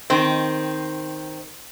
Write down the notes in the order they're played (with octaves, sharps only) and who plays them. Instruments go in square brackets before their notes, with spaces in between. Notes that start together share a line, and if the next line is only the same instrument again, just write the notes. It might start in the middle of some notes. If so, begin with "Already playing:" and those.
[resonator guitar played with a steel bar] D#3 C4